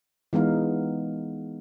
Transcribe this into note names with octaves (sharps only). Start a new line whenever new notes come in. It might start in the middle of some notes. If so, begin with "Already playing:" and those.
E3 G#3 B3 D#4 F5